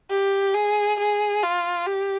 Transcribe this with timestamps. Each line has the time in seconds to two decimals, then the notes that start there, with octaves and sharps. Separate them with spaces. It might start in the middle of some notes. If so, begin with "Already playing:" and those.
0.10 G4
0.54 G#4
0.99 G#4
1.43 F4
1.86 G4